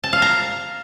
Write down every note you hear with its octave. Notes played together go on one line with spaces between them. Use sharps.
A5
F5
A#5